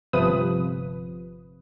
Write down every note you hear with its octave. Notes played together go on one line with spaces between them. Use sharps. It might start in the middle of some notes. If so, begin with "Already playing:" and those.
G1 C3 F3 B4 D#6